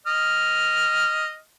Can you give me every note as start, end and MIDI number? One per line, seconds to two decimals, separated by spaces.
0.07 1.37 75
0.07 1.37 89